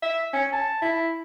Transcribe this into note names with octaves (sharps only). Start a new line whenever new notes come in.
E5
C#4
A5
E4